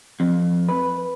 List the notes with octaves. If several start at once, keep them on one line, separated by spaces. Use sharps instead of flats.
F2
B4